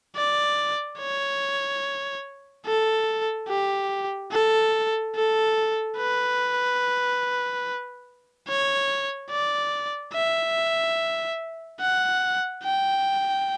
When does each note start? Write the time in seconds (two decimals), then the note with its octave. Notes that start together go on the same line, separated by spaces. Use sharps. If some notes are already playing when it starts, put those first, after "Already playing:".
0.16 D5
0.99 C#5
2.66 A4
3.49 G4
4.32 A4
5.15 A4
5.98 B4
8.48 C#5
9.30 D5
10.14 E5
11.80 F#5
12.64 G5